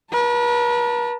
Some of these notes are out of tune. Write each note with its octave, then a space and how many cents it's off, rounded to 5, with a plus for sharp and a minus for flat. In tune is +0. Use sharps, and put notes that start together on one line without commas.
B4 -45 A5 +30